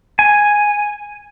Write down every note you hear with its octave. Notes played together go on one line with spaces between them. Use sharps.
G#5